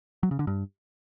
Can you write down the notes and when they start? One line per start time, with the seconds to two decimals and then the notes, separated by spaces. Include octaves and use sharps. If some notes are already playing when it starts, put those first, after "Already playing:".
0.23 F#3
0.31 C#3
0.39 D3
0.47 G2